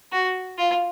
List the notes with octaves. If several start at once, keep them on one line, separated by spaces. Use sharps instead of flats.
F#4
F4